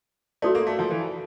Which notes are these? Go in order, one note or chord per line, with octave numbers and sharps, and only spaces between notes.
A3 F#4 A4 D5
A#3
A3
F3
E3